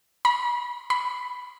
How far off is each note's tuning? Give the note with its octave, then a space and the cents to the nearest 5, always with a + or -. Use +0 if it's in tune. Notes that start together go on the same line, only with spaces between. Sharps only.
B5 -35
B5 +5